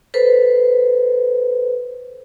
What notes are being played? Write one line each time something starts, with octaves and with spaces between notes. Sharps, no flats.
A4 B4 C5